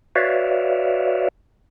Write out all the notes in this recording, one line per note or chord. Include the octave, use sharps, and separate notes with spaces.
F#4 B4 C#5 D5 E5 F5